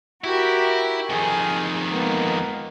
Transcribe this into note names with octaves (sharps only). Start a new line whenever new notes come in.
E4 F#4 G4 A#4
F2 D#3 G#4
G#3 A#3 B3